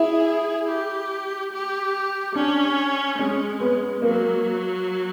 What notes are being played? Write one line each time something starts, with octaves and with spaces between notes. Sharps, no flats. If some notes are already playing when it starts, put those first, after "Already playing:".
Already playing: E4 G#4
G4
G4
C#4 D4
G#3 C#4
B3
F#3 A#3